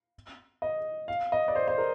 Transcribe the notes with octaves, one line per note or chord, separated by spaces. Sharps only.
D#5
F5
D#5
D5
C5
C5
A#4